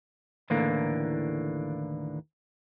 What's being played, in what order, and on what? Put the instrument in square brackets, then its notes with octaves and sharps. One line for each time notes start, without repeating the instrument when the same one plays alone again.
[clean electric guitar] D#2 A2 D3 E3 A#3